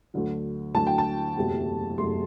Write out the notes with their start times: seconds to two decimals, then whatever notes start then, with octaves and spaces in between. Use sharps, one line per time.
0.14 D2 D3 F#3
0.74 D2 D3 F#3 A5
0.87 G5
0.98 A5
1.37 F#1 E2 C3 F#3 A3
1.98 F#1 E2 C3 F#3 A3 C6